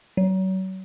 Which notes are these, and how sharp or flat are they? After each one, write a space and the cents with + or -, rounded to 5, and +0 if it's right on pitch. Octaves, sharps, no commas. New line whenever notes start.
F#3 +35